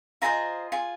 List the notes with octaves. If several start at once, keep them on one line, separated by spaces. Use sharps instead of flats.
F4 G#4 C5 D#5 A#5
F4 G#4